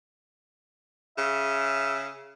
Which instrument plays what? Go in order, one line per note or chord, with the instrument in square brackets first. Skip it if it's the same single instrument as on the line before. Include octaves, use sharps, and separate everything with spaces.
[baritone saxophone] C#3 [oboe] E5